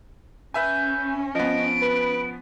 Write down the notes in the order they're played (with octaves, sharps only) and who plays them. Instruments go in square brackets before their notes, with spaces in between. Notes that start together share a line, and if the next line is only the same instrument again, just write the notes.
[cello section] C#4 [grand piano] B4 E5 G#5 [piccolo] G6
[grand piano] F3 B3 [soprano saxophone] D#5 [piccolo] D7
[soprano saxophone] B4